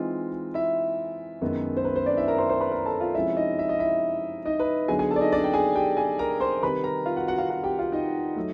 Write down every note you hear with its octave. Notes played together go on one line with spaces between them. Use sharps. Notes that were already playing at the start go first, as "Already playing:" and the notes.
Already playing: E3 G#3 C4 D#4 F4
E4 E5
F#2 D#3 G#3 B3
C5
B4
C5
D4 D5
E4 E5
A#4 A#5
C5 C6
C5 C6
B4 B5
A#4 A#5
A4 A5
F4 F5
C3 F3 G#3 C#4 E4 F4 E5
D#4 D#5
E5
D#5
E4 E5
D#4 D#5
B4
D3 F#3 B3 D#4 G#4 G#5
G#4 G#5
A4 A5
D5
D#4 D#5
D4 D5
G5
G#4 G#5
G4 G5
G#4 G#5
A#4 A#5
C5 C6
C3 D#3 G3 B4 B5
A#4 A#5
F4 F5
F#4 F#5
F#4 F#5
F4 F5
F#4 F#5
G4 G5
F4 F5
D#4 D#5
F#3 A3